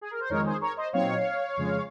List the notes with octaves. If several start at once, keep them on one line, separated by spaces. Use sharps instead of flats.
G#4
A#4
C5
F2 D#3 G#3 D#4 A#4 C#5
G#4 C5
A#4 C#5
C5 D#5
A#2 F#3 C4 D#4 C#5 F5
F2 C#3 G#3